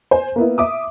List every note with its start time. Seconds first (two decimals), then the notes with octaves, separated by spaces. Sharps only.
0.11 C5 G#5
0.36 A#3 B3 E4
0.58 E5 D6 D#6